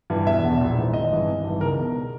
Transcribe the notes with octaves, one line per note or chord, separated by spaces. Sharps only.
G2 E3
E1 E5
E2 B2
A#1
G#2 E3
G#1 D#5
G2 E3
G#1
G2
E3
C#2 A#4
B2